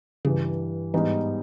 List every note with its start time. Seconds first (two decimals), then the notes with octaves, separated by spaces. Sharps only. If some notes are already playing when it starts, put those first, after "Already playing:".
0.25 G2 C#3 E3 G3
0.94 G#2 E3 G3 B3 D#4